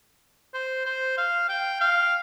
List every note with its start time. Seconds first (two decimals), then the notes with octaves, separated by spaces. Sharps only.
0.54 C5
0.86 C5
1.18 F5
1.49 G5
1.81 F5